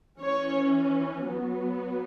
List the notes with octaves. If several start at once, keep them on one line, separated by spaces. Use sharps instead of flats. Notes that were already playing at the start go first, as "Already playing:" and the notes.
E3 C#4 C#5
F#3 B3